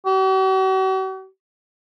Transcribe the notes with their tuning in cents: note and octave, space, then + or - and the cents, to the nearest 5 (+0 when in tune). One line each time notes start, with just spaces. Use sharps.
F#4 +45